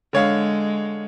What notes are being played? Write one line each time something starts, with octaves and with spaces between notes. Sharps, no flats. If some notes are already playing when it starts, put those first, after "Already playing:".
D3 G#3 C#5 F5